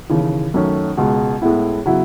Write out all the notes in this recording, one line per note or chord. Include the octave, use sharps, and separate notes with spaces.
D#2 C#3 E3
F#2 D#3 A3 C#4
C#2 B2 G#3
A2 G#3 B3 E4
C#3 F#3 B3 E4